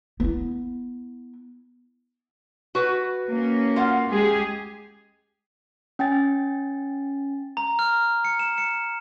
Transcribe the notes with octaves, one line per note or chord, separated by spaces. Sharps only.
B3 E4
F#4 B4
A#3 C#4
F4 F5 F#5
G#3 G4 G#4
C#4 G5 G#5 A6
A#5
F6
C#7
E7
C#7